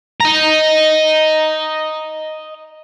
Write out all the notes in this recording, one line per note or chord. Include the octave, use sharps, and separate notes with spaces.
D#5 A#5